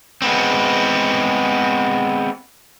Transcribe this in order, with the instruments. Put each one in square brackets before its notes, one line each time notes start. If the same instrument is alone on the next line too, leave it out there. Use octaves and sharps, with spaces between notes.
[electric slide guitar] G#3 B3 C4